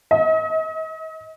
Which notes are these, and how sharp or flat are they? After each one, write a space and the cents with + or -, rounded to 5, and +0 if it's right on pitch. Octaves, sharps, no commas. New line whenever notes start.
D#5 +45